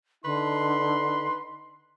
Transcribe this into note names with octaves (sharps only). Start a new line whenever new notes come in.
D3 D#4 B4 C6